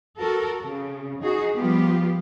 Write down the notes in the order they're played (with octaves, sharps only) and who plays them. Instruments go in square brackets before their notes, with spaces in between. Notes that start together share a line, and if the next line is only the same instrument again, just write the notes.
[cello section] F#4 A4 A#4
C#3
D#4 F#4 G#4
F3 G3 B3 F4 G4